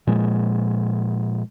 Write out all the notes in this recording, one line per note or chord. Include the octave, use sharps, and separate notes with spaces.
A#2 F3 G#3